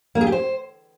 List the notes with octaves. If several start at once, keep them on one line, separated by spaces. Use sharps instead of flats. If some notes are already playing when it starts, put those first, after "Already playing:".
A#3
G#4
G4
C5